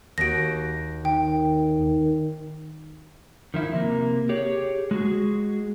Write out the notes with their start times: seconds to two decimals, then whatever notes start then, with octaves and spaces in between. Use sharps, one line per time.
0.18 D#2 F#4 A#6 D7
1.05 D#3 G5
3.54 D#3 F3 E4
3.73 C3 A#3
4.29 G4 G#4 C#5
4.91 G#3 F#4 G#4